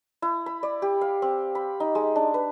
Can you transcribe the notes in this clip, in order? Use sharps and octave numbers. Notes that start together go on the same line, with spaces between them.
E4
B5
D5
G4
F5
C4
B5
D#4
G#3
D4
B4